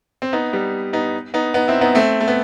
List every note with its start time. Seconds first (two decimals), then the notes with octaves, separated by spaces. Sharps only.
0.22 C4
0.33 B3 D#4
0.53 G3 B3
0.93 B3 D#4
1.34 B3 D#4
1.54 B3 D#4
1.68 C4 E4
1.81 B3 D#4
1.95 A3 C4
2.21 A3
2.28 B3